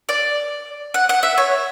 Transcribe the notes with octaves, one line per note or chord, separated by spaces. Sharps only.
D5
F#5
F#5
E5
C#5